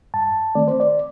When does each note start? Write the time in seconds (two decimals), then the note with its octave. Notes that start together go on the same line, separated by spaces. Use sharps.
0.14 G2 A5
0.55 D#3 A3 C4 D5
0.68 C5
0.80 D5